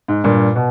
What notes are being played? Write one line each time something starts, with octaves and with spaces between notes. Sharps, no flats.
G#2
G2 A#2
B2